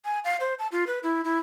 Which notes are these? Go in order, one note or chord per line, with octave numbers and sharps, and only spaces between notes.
G#5
F5
C5
A5
F4
B4
E4
E4